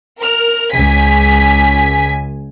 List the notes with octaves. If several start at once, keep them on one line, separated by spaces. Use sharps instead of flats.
A#4 F6
C#2 G#5 B6